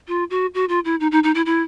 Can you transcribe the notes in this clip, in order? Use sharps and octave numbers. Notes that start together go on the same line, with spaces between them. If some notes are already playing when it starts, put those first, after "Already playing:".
F4
F#4
F#4
F4
E4
D#4
D#4
D#4
E4
E4